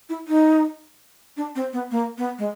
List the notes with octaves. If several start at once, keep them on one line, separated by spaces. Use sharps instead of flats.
E4
D#4
D4
C4
B3
A#3
B3
G#3